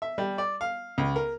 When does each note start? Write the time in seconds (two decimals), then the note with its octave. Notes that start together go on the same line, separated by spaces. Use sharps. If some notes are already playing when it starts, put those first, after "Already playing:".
0.02 E5
0.18 G3
0.38 D5
0.61 F5
0.98 C#2
1.16 A#4